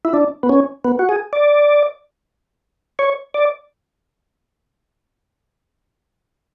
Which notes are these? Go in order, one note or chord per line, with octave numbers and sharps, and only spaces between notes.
E4
D4
B3
C#4
B3
F#4
G#4
D5
C#5
D5